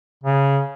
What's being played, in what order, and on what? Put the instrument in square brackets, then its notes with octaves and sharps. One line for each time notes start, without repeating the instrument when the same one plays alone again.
[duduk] C#3